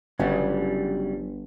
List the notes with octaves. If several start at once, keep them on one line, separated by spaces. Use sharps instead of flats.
G1 C#3 F#3 G3